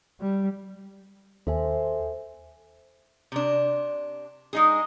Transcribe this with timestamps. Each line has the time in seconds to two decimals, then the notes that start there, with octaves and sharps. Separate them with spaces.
0.21 G3
1.47 D#2 A4 C5 E5 G#5
3.32 C3 D4
4.53 G#3 D#4 G#4